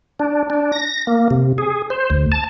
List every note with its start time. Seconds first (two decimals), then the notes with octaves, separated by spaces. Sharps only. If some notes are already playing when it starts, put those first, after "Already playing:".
0.20 D4
0.50 D4
0.72 A#6
1.07 A#3
1.31 C3
1.58 G#4
1.90 C5
2.10 D2
2.32 A5